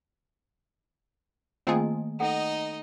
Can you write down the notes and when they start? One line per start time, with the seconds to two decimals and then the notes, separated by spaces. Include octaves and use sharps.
1.67 D#3 A3 A#3 C4 F4 G#4 D#5 G#5
2.20 D#4 A4 D#5 F#5 G5